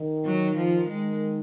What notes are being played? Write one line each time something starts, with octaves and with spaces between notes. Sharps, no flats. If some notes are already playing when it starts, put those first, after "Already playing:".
Already playing: D#3
F#3
F3
D#3 G#3